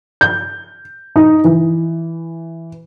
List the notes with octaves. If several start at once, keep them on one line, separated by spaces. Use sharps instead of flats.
G6
D#4
E3